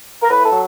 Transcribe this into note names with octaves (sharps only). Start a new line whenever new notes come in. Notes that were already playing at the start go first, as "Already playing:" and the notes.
A#4
A2 B4
A4
F#3